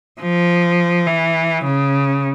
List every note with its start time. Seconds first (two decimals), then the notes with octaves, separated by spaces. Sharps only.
0.21 F3
1.07 E3
1.65 C#3